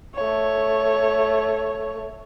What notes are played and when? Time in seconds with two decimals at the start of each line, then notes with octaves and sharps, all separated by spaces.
0.15 A3 C#5